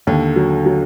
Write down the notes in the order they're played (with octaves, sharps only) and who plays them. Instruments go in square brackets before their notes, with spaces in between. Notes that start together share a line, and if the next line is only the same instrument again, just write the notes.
[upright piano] D#2 [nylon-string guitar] D3
[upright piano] F#3
F#3